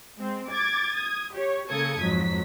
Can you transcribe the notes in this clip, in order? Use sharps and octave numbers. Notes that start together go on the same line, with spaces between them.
G#3 C4
D6 G#6 A6
D#6 G#6
G4 C#5
C#3 A#3 A4 D#6 G#6 C#7
F2 G#2 F#3 B6